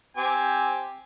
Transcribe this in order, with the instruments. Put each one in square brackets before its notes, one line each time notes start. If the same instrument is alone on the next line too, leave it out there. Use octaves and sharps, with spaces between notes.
[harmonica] C4 G4 G#5